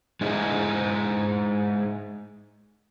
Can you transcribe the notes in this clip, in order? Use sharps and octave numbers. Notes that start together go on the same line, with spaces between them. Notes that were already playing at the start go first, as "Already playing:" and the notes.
G#3 D#4 E4 G#4